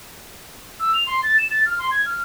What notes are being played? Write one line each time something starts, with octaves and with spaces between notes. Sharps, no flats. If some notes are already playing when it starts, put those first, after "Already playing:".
E6
F7
C6
A6
E7
A6
F6
C6
G#6
F6